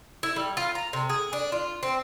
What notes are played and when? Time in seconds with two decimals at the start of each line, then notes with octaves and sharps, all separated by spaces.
0.23 E4
0.36 G3
0.57 F4
0.75 A#5
0.93 C3
1.09 G#4
1.33 D4
1.52 F4
1.83 C4